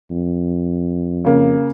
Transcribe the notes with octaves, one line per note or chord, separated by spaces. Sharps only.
F2
C#3 A#3